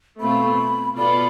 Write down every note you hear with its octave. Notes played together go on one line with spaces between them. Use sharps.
B2 A3 C4 F4 B5
B2 B3 F4 A4 D5 B5